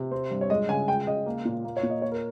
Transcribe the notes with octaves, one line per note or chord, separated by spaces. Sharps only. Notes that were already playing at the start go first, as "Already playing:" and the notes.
Already playing: C3
C4
G2
C#5
G#3 D#5
C#3 G#5
G#3 G5
C#3 D#5
A#3
A#2
A#3
C#5
A#2
D#5
A#3 C#5
A#4